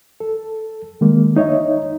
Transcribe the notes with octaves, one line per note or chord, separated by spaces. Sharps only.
A4
D#3 G#3 A#3
D#4 C#5 D#5 E5